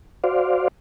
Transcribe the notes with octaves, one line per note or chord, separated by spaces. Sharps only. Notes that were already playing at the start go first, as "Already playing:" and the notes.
F#4 C5 D5 F5